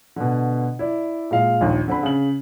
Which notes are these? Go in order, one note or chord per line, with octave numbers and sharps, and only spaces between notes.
B2 D3
E4 D5
A#2 G#3 F5
A#1 D#2
D3 C4 B5
C#3 F#7